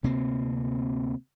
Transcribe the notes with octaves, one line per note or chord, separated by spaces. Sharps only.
D2 C3 A#3 C4